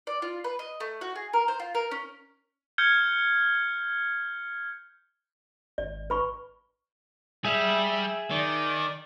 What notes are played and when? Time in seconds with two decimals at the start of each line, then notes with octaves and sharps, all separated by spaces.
0.07 D5
0.22 F4
0.44 B4
0.59 D#5
0.80 A3
1.01 F#4
1.16 G#4
1.33 A#4
1.48 C5
1.60 F4
1.75 A#4
1.91 C#4
2.78 F6 G6 G#6 C#7 G7
5.78 G#1 D5
6.10 B4 B5 C#6
7.45 G3 G#4 E5
8.31 D#3 D5